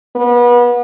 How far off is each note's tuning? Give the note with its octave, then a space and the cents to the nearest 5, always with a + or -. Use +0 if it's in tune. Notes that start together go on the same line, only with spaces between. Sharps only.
B3 -30